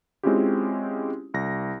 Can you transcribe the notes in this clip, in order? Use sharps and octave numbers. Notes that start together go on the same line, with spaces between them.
G#3 C4 C#4 E4 F4 G4
C2 A#6